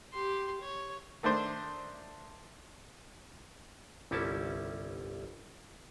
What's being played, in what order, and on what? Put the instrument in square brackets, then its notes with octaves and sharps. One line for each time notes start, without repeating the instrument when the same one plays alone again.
[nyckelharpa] G4 C6
C#5
[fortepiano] D#3 A3 D4 C5
[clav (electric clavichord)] G1 C2 G3 C#4 E4 A5